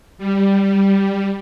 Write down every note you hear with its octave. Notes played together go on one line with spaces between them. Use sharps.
G3